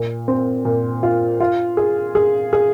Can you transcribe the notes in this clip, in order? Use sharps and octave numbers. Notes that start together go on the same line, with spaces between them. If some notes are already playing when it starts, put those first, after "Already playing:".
Already playing: A#2
C4
A#2
F4
F4
G#4
G#4
G#4